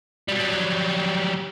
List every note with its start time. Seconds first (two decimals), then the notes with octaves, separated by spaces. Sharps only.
0.28 F#3 G3